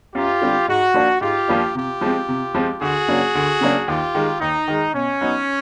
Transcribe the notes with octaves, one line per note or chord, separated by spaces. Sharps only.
F#2 F4 G4
D3 G3 C4
G#2 F#4
F3 A#3 D4
G#2 F4 G4
F3 A#3 D4
C3 F4 G4
F3 G#3 C4
C3
F3 G#3 C4
D2 F#4 G#4
C#3 F#3 A#3 D4
D2
C#3 F#3 A#3 D4
D#2 F4 G4
D#3 G#3
D#2 D#4
D#3 G#3
B2 C#4
F#3 B3 D#4